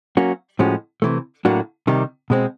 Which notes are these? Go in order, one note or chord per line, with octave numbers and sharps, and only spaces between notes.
F#3 A#3 C#4 F#4
A2 F3 G#3 C#4 F#4
C3 E3 A3
A2 F#3 A#3 D4 F#4
C3 D#3 G3
B2 G#3 C4